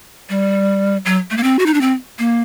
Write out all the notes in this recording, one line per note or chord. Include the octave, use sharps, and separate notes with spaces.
G3
F#3
A3
A#3
C4
F#4
D#4
D4
C4
A#3